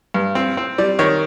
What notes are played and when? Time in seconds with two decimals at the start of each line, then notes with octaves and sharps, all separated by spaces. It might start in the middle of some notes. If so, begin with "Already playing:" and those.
0.14 G2
0.35 C4
0.57 C4
0.78 G3 D5
0.99 D#3 C#5